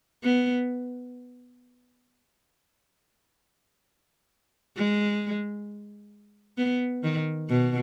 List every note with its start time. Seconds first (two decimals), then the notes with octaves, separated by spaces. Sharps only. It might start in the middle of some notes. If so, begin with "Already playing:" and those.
0.23 B3
4.77 G#3
6.58 B3
7.04 D#3
7.49 B2